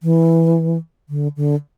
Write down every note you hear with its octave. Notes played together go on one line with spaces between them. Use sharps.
E3
D3
D3